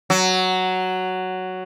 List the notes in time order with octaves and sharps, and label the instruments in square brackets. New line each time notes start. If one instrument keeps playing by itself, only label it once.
[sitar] F#3